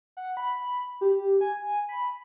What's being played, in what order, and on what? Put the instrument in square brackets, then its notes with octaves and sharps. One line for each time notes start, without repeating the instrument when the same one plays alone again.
[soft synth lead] F#5
B5
G4
G#5
B5